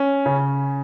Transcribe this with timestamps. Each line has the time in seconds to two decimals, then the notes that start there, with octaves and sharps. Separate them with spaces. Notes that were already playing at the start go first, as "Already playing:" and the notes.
Already playing: C#4
0.26 C#3